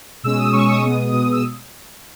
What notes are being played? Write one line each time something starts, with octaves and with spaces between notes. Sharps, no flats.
B2 G#3 C#4 E6
D#6
B2 G#3 C#4 C#6
D#6
B2 G#3 B3 D#6
B2 G#3 B3 D#6
E6